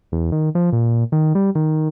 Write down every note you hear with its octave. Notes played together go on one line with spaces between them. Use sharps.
E2
D#3
F3
A#2
D#3
G3
D#3